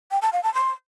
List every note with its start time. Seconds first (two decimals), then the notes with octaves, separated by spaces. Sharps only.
0.11 G5
0.22 A5
0.33 F5
0.43 A5
0.54 C6